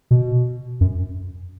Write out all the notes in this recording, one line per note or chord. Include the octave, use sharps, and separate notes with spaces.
B2
F#2